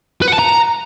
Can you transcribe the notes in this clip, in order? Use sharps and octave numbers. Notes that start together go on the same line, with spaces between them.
B4
F#5
A5
A#5